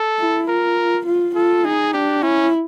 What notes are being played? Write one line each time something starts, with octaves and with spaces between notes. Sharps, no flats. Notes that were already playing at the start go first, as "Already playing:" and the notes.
Already playing: A4
E4
F4 A#4
F4
F4 A4
D#4 G#4
D4 G4
C#4 E4